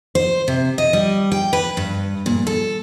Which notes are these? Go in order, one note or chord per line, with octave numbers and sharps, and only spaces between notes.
C5
C3
D#5
G3
G5
B4
G2
A#2
A4